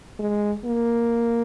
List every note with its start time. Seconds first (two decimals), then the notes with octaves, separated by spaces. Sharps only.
0.19 G#3
0.65 A#3